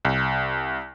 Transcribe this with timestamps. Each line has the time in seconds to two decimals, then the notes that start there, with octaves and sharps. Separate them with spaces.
0.05 C2